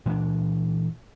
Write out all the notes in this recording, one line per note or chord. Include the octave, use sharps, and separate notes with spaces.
A#2 E3 C4 D4